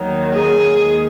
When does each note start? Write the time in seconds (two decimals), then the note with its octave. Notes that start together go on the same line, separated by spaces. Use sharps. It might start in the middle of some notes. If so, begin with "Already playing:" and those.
Already playing: D#2 D#3 F#3 D#4
0.33 G#4
0.76 D#2 D#3 G#3